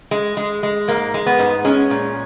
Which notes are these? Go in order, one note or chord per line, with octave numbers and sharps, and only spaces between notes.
G#3
G#3
G#3
G#2 A#3
G#3
B3
G#2
G#3 C#4
A#2